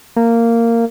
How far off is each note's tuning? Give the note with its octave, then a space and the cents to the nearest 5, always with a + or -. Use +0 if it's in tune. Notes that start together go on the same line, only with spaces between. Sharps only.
A#3 -15